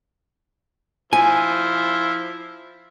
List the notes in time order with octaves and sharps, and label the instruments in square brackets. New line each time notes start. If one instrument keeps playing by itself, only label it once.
[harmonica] F3 E4 [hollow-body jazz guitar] G#5